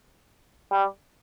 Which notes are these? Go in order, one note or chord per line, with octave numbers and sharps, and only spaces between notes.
G3